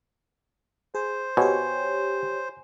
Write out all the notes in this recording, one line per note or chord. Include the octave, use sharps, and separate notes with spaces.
G#4 C5
B2 G4 C#5 G#5